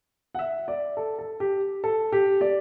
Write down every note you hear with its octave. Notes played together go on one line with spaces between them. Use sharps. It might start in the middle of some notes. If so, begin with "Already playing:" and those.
F#5
E5
D5
A4
A4
G4
A4
G4
D5